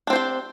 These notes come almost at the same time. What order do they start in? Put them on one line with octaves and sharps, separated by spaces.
D4 C4 C5 G4